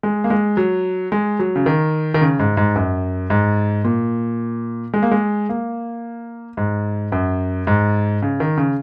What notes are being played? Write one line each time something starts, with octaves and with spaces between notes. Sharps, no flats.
G#3
A#3
G#3
F#3
G#3
F#3
C#3
D#3
D#3
C#3
G#2
G#2
F#2
G#2
A#2
G#3
A#3
G#3
A#3
G#2
F#2
G#2
C#3
D#3
C#3